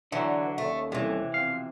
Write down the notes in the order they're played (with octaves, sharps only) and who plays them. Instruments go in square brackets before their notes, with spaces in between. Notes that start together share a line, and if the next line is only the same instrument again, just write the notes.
[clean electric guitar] D3 F#3 [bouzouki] E3 [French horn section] D4
[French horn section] D#2 C#4 A4 [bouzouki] A3
[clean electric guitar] C2 [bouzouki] C3 E3
[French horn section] B2 F3 C4 [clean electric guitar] F5